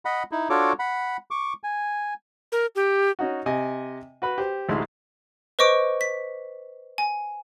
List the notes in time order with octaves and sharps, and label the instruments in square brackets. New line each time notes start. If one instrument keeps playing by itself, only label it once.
[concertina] D#5 F#5 B5
D#4 E4
D4 F4 F#4 A4 C#5 D6
F#5 B5
C#6 D6
G#5
[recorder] A#4
G4
[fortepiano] C#4 D#4 F#4
C3 D#5 G#5
F#4 B4 B5
G4 C5
A1 D2 G#3 D#4 E4 C6
[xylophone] B4 C5 D#5 C#6 D6 D7
B6
G#5